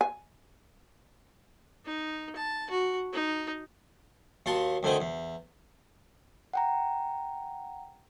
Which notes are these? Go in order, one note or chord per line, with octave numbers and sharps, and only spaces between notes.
G#5
D#4
A5
F#4
D#4
D#2 F#4 F5 A5 C6
D2 D3 D#3 C4 G#5
E2
F#5 G5 A#5